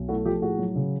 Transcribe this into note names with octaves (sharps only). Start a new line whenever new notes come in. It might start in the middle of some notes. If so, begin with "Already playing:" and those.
Already playing: B1
A3 E4 F#4
F3 F4 G4
A2 F#4 G#4
F#3
C#3